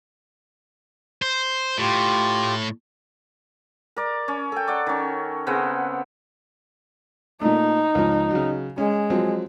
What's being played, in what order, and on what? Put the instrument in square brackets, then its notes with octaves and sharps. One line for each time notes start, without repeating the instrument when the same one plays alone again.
[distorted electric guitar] C5
[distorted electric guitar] A2 [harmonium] F4 G4
[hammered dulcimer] A#4 D5
C#4
A4 G5
D5 F#5
D#3 C#4
C#3 B3 C4 F#5
[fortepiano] A#2 A3 [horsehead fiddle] D#4
[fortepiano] C#2 F3
C#3 F#3
[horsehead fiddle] G#3 [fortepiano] C#4
[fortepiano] F3 F#3 C4